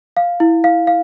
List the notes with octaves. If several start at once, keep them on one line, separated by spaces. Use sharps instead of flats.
F5
E4
F5
F5